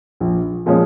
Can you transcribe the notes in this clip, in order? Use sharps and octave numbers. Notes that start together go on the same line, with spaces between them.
A#1
A#2 F3 G#3 C#4